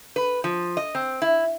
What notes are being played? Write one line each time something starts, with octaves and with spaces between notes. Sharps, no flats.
B4
F3
D#5
C4
E4